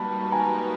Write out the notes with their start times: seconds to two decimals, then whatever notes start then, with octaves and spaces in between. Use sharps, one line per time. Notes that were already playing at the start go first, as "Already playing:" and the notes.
Already playing: G3 A#3 D#4 F#4 B4 A5 B5
0.23 A5
0.32 G#5 A#5